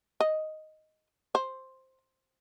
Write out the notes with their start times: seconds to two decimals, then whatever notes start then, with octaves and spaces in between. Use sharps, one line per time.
0.20 D#5
1.35 C5